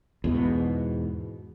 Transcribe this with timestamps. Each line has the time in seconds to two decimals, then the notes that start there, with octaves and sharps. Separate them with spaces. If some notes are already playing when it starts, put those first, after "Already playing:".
0.24 E2 G#2 B2